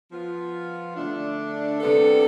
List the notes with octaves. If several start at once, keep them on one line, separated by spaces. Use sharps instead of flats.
F3 B3 F4
D3 A3 D4
C3 G3 B3 D4 A4